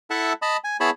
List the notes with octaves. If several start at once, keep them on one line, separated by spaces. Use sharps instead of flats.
E4 A4 E5 F#5 A5
D#5 A5 B5
G#5
B3 E4 G#4 C#5 A5 B5